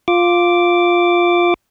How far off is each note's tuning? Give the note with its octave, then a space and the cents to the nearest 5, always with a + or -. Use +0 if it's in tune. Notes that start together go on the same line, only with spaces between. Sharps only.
F4 +5 D6 +0